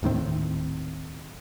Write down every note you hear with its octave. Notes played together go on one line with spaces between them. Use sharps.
D#1 A2 D#3 C4